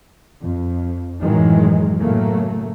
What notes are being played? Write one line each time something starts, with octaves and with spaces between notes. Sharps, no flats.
F2
F#2 A2 D#3 E3 F#3 G#3
A2 C#3 F#3 A3 A#3